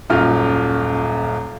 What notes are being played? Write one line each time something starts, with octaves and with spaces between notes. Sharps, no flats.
D#1 F#2 F4 F6